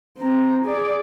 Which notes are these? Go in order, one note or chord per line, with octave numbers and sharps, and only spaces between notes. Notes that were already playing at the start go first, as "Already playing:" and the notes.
C4 A#5
G#4 D5